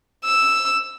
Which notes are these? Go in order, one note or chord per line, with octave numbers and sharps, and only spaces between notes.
E6